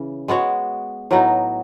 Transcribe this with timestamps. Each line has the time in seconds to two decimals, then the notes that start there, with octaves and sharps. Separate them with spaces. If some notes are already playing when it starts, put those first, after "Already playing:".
Already playing: C#3 E3
0.28 G#3 B3 F#4 C#5
1.11 A2 F#3 B3 D#4